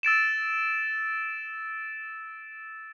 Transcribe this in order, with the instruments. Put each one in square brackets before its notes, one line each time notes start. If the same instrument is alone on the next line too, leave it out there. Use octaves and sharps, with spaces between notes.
[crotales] E6 A6 D7 E7